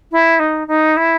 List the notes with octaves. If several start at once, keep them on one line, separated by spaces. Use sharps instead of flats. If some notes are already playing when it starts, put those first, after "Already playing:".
E4
D#4
D#4
E4